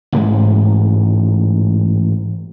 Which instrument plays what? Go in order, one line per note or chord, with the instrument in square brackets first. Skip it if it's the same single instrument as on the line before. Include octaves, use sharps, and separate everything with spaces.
[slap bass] A1 G#2 G#3